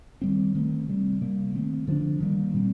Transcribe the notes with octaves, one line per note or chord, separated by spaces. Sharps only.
D#3 G3 C4
D#3 A3 C4
C3 G3 C4
C3 G3 A#3
D#3 A3 C4
D3 F3 A#3 D4
D#3 G3 A#3
A#2 G3 C4